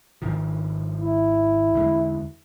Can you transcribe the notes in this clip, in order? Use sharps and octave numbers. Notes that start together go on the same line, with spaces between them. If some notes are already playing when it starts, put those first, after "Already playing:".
G#1 D#3 F3
E4
E2 D3 G#3